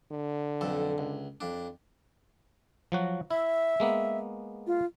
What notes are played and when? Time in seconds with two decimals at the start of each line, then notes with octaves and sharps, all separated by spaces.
0.12 D3
0.61 B1 F2 A4
0.98 C#2
1.41 F2 D4
2.92 F3 F#3 F#4
3.31 E4 E5
3.80 G#3 A#3 B3
4.67 F4